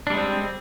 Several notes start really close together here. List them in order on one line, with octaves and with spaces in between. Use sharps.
D4 G3 G#3 C4